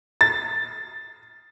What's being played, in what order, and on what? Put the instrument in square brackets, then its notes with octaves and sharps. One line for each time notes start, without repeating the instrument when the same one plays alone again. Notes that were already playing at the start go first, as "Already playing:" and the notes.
[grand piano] A6